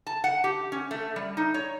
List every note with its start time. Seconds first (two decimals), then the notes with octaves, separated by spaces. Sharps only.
0.07 A5
0.24 F#5
0.44 G4
0.72 C#4
0.91 A3
1.16 G3
1.37 D#4
1.54 C#5